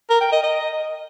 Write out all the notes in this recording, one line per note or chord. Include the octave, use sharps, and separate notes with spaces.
A#4
G5
D#5
D#5